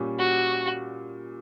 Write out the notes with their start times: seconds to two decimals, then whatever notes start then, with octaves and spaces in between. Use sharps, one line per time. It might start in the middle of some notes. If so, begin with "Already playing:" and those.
Already playing: A#2 G3 C#4
0.19 F#4